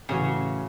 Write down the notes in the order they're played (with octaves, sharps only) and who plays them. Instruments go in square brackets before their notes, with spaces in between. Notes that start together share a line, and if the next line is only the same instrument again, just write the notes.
[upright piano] A2 E3 C#4 F#4 [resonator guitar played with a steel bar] C#3